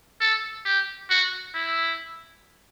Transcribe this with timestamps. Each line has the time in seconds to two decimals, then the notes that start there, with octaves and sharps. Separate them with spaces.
0.21 A4
0.65 G4
1.10 F#4
1.54 E4